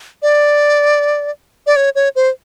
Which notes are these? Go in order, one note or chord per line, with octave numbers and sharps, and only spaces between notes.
D5
D5
C#5
C#5
C5